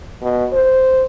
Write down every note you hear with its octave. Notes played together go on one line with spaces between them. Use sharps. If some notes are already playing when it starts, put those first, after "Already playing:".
B2
C5